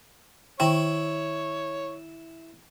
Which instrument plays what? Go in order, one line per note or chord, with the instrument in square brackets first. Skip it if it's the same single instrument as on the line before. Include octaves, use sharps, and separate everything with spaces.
[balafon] D#3 G5 [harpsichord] E4 [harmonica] C#5